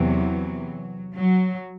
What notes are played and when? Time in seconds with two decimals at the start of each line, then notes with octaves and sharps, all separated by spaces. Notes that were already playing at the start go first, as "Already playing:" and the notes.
Already playing: E2 C3 E3 F#3
1.16 F#3